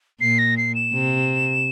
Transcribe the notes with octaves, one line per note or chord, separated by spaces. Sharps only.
A#2 C7
A#6
C7
E7
C3